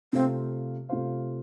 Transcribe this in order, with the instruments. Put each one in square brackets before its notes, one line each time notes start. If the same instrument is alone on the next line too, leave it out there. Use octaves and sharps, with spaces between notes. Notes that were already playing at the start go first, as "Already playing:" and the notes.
[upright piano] C3 A3 F4 C5 F5 [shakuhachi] C4
[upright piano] C3 A3 F4 C5 F5